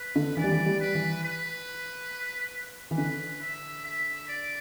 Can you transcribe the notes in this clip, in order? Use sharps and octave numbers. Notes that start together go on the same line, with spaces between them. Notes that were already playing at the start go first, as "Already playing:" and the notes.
Already playing: B4
D3
E3 D5
G3
E3
G3
B4
E3
B4
E3
D3 B4
E5
E5
D5